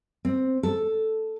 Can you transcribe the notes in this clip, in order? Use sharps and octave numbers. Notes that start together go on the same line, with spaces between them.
C4
A4